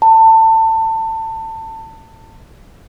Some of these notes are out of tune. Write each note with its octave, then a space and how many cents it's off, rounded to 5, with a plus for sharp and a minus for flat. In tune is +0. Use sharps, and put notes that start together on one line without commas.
A5 +25